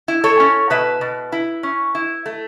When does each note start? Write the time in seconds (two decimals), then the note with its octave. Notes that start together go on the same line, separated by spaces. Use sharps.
0.08 E4
0.24 A4 C#5
0.40 C#4
0.70 B2 B4 E5
1.01 B2
1.32 E4
1.63 C#4
1.95 E4
2.26 A3